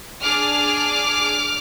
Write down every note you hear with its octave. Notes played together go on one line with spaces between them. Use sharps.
D4 G#4 D6 F6